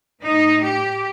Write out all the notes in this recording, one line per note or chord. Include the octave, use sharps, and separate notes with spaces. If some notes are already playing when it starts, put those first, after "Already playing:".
A2 D#4
G4